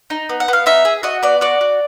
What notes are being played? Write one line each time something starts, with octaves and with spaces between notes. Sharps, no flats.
D#4
B3
F#5
B3 F5
D#4 E5
G#4
F#4 D#5
B3 D5
F#4 D5
F#4